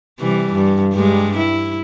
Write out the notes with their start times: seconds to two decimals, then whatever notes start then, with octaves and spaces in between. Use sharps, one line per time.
0.20 C3 E3 G3
0.54 G2
0.93 G2 G3 G#3
1.38 E4